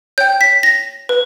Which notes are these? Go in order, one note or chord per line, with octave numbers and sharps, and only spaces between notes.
C#5 G5 G6
B6
A#6
B4